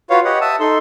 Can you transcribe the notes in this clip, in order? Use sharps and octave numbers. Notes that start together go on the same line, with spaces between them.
F4 F#4 B4 C#5 F5
G4 B4 C#5 D#5 F#5
E5 A5 D#6 E6
D#4 A4 C6